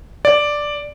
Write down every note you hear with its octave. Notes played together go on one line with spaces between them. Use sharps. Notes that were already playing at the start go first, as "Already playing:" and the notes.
D5